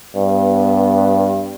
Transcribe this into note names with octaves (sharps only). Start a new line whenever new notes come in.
G2 B3